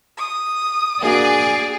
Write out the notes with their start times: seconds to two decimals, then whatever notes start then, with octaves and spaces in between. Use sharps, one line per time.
0.18 D#6
1.02 A#3 D4 F#4 G#4 D5